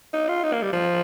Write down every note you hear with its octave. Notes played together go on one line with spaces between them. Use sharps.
D#4
F4
D#4
A#3
G3
F3